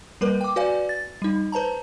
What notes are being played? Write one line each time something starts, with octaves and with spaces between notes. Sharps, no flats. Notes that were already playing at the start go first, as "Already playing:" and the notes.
G3 A#3 A#4 B4
G5 D6
F#4 B4 D5 F5 G#5
A6
G3 D#4
B4 C5 A5 A#5